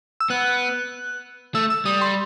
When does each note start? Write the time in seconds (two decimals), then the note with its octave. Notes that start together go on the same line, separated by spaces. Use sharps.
0.20 E6
0.30 B3 F#6
1.55 A3 E6
1.70 E6
1.85 G3 D#6
2.01 C6